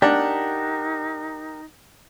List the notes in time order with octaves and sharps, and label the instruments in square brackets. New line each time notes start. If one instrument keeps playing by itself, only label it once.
[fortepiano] D4 [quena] D#4 [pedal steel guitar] G4 A#4 F#5